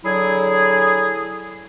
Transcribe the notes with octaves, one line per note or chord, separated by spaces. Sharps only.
D3 F#3 E4 G#4